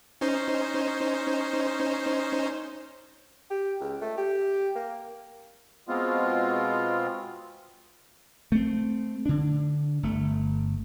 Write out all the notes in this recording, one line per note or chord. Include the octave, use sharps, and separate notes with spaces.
C#4 D#4 C5
G4
C#2
A3
G4
A#3
B2 G#3 B3 C4 F4
A3 C4
D3 D4
G1 A3